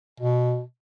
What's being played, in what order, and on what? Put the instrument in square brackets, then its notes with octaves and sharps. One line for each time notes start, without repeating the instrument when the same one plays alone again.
[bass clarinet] B2